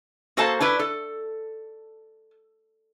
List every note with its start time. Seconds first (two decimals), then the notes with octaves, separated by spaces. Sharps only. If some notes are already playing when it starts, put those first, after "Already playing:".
0.37 A#3 F#4 A4 C5 A5
0.61 D4 E4 B4
0.79 A4